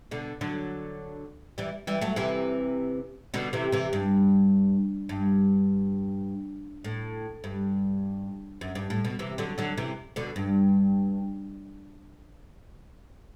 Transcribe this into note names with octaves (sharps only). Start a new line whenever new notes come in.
B2 D3
D3 F#3
E3 G3
E3 G3
F#3 A3
C3 E3
B2 D3
C3 E3
C3 E3
G2
G2
A2
G2
F#2
G2
A2
B2
C3 E3
D3 F#3
D3 F#3
C3 E3
B2 D3
G2